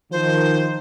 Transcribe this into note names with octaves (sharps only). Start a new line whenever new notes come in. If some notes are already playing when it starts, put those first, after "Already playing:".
D#3 F3 C5